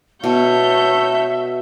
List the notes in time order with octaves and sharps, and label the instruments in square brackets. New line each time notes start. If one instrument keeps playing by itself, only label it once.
[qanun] B2 [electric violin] C#5 G6 [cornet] E5 [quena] A5